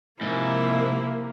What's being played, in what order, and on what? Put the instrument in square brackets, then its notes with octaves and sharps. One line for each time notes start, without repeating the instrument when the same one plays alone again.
[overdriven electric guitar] G#2 [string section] C3 A#3 [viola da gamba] F3 E4